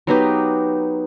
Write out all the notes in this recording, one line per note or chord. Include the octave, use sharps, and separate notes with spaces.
F#3 B3 D#4 G4